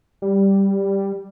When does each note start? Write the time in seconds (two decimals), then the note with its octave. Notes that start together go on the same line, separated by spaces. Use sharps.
0.22 G3